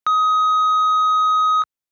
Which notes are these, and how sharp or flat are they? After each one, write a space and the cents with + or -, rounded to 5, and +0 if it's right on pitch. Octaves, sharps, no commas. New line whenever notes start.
D#6 +20